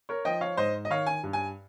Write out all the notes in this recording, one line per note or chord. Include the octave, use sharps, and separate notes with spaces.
A#4 C#5
F3 D#5 G5
C#5 F5
G#2 C5 D#5
D#5
D#3 C#5 F5
G#5
G2
G#5